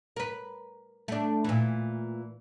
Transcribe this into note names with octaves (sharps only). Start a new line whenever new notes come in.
A#4 B4
A3 D4
A#2 E3